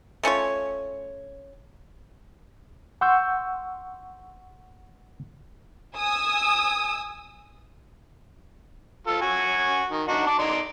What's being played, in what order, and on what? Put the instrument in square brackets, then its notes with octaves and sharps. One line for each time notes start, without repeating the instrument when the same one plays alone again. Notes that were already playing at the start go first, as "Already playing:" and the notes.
[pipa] A3 C#4 F4 C#5
[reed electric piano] F#5 C6 C#6 E6 G6
[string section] G#5 D#6 E6
[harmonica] F4 A4
F#4 G#5
D#3
D4 D#4 F#4
A5 D6
D#4 D5 C6